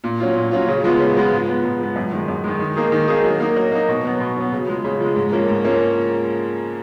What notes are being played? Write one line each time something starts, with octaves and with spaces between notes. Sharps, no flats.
A#2
F#3 C#4 F4
A#2
F#3 C#4 F4
C#3
F3 G#3 B3 F4
C#3
F3 G#3 B3 F4
G#2
F3 B3
G#2
F3 B3
F#2
D#3 G#3
F#2
D#3 G#3
D#3
A#3 D#4 G#4
D#3
A#3 D#4 G#4
F#3
A#3 D#4
F#3
A#3 D#4
B2
F#3 B3
B2
F#3 B3
C#3
F3 G#3
C#3
F3 G#3
G#2
F3 A#3 C#4
G#2
F3 A#3 C#4